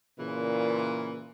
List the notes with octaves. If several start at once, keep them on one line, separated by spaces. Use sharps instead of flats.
A#2 C#3 E3